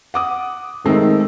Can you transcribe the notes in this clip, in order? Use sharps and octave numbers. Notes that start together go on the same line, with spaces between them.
F#5 D6 D#6
D#3 G#3 A3 C4